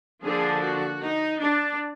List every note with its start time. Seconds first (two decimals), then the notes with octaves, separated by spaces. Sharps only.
0.23 D3 F3 A#3 D4 G#4
0.63 F#4
1.02 D#4
1.41 D4